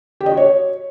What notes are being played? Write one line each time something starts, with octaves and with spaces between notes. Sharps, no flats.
G4
D#5
F#4
C#5